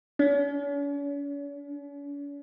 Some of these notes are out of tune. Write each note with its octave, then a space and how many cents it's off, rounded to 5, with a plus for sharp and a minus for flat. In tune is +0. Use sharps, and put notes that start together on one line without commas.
C#4 +45